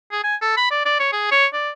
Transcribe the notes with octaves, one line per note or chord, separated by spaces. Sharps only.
G#4
G#5
A4
B5
D5
D5
C#5
G#4
C#5
D5